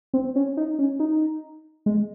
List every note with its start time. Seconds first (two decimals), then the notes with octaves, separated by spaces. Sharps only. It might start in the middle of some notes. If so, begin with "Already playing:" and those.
0.13 C4
0.36 C#4
0.57 D#4
0.79 C#4
1.00 D#4
1.86 G#3